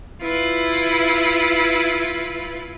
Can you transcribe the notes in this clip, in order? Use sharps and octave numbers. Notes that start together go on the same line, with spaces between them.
E4 F4 B4